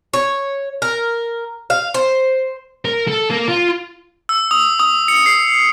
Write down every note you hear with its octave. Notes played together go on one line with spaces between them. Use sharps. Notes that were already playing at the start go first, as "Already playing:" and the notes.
C#5
A#4
F5
C5
A#4
A4
A#3
F4
E6
D#6
D#6
C#7
C7